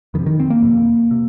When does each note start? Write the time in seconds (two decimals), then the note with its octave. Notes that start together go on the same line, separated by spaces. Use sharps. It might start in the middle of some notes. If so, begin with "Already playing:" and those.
0.14 F2 D#3
0.19 C3
0.26 D#3
0.40 C4
0.50 A#3
0.62 F2 C3
1.11 C3